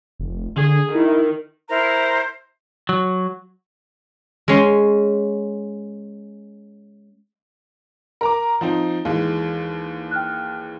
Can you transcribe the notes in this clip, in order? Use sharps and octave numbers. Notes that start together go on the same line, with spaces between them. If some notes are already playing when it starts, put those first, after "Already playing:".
F1
D3 G#4
D#3 E4
E4 A#4 C5 A#5
F#3
G#3 C#4 C6
A#4 A#5 D6
F3 C4 D#4
D#2 E3 G#3
G5 F6 F#6